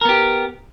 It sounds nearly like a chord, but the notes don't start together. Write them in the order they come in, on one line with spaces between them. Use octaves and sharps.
A#4 B3 G4